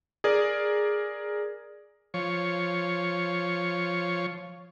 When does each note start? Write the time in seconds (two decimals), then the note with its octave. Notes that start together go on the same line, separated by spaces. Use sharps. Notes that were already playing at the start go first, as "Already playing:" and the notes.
0.24 G#4 A#4 D5
2.14 F3 C#5